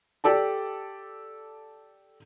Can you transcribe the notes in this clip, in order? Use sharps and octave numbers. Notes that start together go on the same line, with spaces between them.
G4 A4 D5 A5